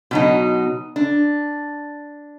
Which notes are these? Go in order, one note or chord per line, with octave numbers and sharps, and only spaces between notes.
B2 F#3 D#4
D4